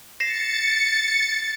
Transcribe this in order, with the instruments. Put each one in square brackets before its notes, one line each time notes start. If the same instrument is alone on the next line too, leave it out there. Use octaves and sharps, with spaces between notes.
[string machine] A6 C#7 [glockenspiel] A#6 C7 E7